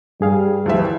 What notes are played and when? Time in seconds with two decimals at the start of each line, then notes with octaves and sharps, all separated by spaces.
0.21 G2 G3 G#4 F5
0.66 D2 E3 F3 E5